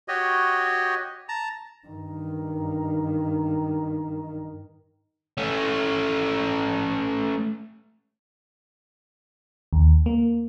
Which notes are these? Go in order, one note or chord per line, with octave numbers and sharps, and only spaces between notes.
F#4 G4 C#5 D#5
A5 A#5
G2 D#3
A3 C#4
D#2
A#3